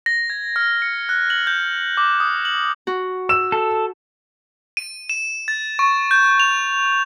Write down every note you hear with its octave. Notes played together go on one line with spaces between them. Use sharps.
A#6
G#6
F6
C#7
F#6
F#7
G6
D6
D#6
F#7
F#4
E6 E7
A4
D#7
E7
A6
C#6
G6
F7